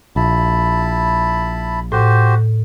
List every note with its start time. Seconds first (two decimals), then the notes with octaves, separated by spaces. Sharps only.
0.16 A#1 E4 A5 B5
1.92 A2 F#4 G4 C5